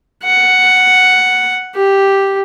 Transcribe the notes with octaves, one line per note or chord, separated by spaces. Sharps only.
F#5
G4